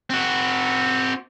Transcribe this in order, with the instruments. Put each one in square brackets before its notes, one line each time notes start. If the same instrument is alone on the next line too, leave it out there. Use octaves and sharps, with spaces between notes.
[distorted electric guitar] C4 F#4